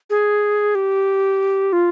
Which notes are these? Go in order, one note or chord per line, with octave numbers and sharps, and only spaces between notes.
G#4
G4
F4